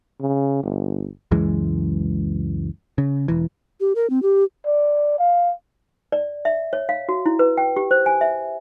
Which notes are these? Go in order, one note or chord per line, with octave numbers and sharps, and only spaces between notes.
C#3
G1
C#2 F#2 E3 G#3
C#3
E1 E3
G4
A#4
C4
G4
D5
F5
D5
E5
C#5
F5
F#4
E4
B4
G5
G4
C5
G#5
E5